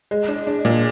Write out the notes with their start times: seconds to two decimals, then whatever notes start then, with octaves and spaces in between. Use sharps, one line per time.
0.11 G#3
0.28 D4
0.47 D4
0.65 A#2